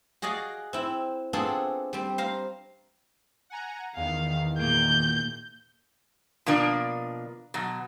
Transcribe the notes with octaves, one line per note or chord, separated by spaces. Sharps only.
F#4 G#4 D5 D#5 F5
C4 E4
B3 C4 D4 F4 G#4 A4
G3 C4
C5 F5 A#5
F#5 G#5 A#5
E2 D#3 F5
A#2 A#3 G6
B2 F3 A#3 D4
B2 F#3